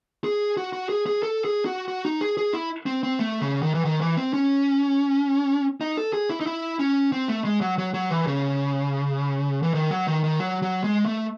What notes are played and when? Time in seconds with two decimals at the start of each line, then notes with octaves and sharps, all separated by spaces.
0.24 G#4
0.57 F#4
0.73 F#4
0.89 G#4
1.06 G#4
1.23 A4
1.45 G#4
1.66 F#4
1.88 F#4
2.05 D#4
2.21 G#4
2.37 G#4
2.53 E4
2.86 C4
3.03 C4
3.20 A3
3.41 C#3
3.63 D#3
3.74 E3
3.85 D#3
4.01 E3
4.17 C4
4.33 C#4
5.81 D#4
5.97 A4
6.13 G#4
6.30 E4
6.40 D#4
6.46 E4
6.79 C#4
7.12 C4
7.28 A3
7.45 G#3
7.61 F#3
7.78 F#3
7.94 F#3
8.10 E3
8.27 C#3
9.63 E3
9.74 D#3
9.91 F#3
10.07 D#3
10.24 D#3
10.40 F#3
10.62 F#3
10.84 G#3
11.06 A3